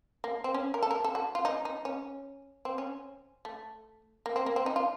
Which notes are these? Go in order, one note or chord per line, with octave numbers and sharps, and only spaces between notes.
A#3
C4
C#4
A#4
A4
A#4
A4
F#4
F4
D#4
D#4
C#4
C4
C#4
A3
A#3
C4
A#3
C4
D#4
F4